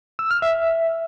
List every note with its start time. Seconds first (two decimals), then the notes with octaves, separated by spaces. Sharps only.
0.19 E6
0.31 F6
0.42 E5